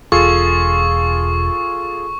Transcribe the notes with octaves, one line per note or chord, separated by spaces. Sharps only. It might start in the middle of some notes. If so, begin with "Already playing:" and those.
E1 F4 G#4 A4 C#6